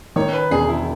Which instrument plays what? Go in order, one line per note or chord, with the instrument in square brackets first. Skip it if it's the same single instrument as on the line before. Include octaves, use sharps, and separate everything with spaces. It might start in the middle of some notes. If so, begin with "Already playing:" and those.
[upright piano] D#3 [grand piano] C#5
[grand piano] B4
[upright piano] E1 [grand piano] G#4
[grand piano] E4